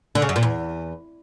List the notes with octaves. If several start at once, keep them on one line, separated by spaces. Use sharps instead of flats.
D3
C#3
F#2
A#2
E2